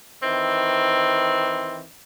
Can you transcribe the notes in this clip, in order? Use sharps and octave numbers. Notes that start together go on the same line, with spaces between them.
D#3 E3 C4